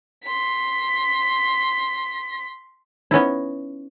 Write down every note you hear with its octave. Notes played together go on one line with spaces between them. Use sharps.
C6 B6
B3 C#4 D#4 E4